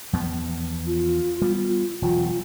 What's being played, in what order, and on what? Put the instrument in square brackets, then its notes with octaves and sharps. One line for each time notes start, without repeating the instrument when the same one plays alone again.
[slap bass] E2 F3 B3
[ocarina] F4
[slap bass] G3 B3
[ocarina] F4
[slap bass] E1 E2 F#3 [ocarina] F4